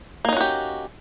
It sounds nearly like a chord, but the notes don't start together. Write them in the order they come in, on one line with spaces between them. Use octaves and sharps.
A#3 D#4 C#4 F#4 G4